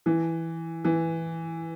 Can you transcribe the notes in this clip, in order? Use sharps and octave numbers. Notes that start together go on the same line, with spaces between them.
E3
E3